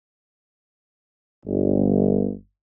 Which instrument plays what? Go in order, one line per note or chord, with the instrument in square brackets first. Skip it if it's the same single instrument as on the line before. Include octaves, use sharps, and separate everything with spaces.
[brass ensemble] G1